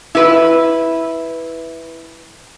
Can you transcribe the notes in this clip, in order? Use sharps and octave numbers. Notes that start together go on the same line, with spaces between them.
E4 B4